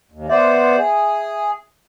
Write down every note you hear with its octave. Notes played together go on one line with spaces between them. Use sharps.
D#2
B3 C5 D5 E5
G#4